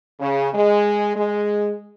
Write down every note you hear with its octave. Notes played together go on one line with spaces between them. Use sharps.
C#3
G#3
G#3